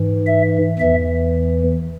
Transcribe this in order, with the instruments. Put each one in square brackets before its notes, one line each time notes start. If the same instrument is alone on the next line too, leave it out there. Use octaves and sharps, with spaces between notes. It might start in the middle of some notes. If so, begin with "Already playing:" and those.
Already playing: [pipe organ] G#2 E3
E5
E2 E3 E5